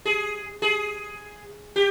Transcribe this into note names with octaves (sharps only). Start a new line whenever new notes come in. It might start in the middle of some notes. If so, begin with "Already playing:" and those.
G#4
G#4
G4